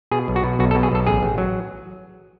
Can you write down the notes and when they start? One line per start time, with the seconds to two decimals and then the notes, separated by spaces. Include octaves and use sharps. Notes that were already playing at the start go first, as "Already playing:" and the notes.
0.11 B2 G#4
0.28 B1
0.36 F#4
0.44 B2
0.59 B1 F#4
0.71 A4
0.75 B2
0.83 G#4
0.92 B1 A4
1.07 A1 G#4
1.23 A1
1.38 F#3